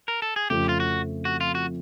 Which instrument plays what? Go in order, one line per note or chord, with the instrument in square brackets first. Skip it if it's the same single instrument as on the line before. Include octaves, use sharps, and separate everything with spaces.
[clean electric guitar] A#4
A4
G#4
[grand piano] F2 C#3 F3 A3 C4 [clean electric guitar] G4
[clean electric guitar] F4
F#4
F#4
F4
F#4